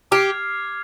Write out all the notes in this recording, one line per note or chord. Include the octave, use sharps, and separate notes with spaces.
G4 D6 F6 G#6 C7